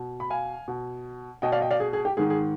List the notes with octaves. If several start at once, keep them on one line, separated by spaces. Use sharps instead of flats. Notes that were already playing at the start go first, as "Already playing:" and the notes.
Already playing: B2
B5
F5 G#5
B2
B2 D#5 G5
D5 F5
D#5 G5
D5 F5
G#4
G#4
G4
G#2 D#3 G#4
G#4